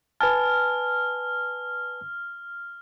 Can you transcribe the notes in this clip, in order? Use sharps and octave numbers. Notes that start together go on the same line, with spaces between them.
B4 G#5 A5 F6